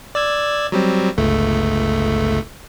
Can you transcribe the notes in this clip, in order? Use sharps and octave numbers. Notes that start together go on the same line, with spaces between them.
D5 E6 G#6
F#3 G3 C4
G1 C#2 A3